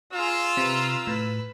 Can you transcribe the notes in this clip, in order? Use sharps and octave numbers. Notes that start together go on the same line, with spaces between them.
F4 G#4 A#5 E6
C3 B4 A#5
A2 B4